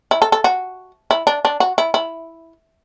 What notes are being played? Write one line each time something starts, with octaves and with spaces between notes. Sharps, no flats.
E4
A4
A4
F#4
E4
D4
D4
F#4
E4
E4